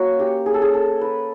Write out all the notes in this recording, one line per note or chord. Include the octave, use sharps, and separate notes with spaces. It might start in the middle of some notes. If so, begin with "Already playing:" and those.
Already playing: A#3 C#4 F#4
G4
G#4
A4
G#4
A4
B4